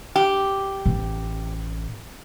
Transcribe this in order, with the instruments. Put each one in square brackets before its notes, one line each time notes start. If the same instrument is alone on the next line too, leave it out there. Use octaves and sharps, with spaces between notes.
[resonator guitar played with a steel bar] G4
[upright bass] A1